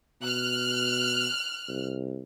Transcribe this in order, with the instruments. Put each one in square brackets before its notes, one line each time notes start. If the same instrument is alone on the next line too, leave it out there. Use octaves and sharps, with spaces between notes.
[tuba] B2 [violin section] F6 F#6
[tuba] C2